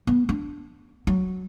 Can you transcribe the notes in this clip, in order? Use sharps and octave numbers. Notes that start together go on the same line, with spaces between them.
B3
D4
F#3